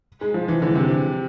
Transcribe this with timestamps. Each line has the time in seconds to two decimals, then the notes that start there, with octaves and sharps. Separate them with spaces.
0.21 G#3
0.34 F3
0.48 E3
0.62 D3
0.75 C3